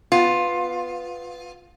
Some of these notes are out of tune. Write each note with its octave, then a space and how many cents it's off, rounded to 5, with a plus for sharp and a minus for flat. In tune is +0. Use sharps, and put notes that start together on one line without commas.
B3 +10 F4 +10